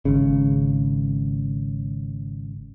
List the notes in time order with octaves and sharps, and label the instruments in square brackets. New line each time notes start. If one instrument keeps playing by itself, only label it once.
[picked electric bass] G#1 C#3